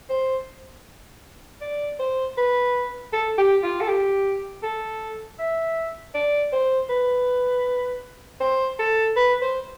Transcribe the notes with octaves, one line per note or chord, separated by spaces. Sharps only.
C5
D5
C5
B4
A4
G4
F4
A4
G4
A4
E5
D5
C5
B4
C5
A4
B4
C5